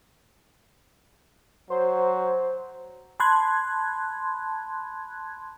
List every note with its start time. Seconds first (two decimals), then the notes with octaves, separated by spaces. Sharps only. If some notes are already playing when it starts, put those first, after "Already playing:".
1.70 F#3 C5
3.20 A5 B5 C6 F#6 G#6